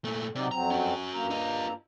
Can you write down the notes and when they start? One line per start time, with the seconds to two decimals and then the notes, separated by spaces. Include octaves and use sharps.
0.05 A#2 A3
0.35 C3 F#3 D#4 D5
0.51 F2 F#3 C4 A#5
0.70 C#4 F#4
1.14 G2 A#3 A#5
1.30 F4 D#5